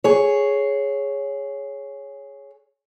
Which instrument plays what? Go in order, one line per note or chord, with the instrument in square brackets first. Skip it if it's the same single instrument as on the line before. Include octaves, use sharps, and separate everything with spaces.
[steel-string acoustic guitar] G#4 C#5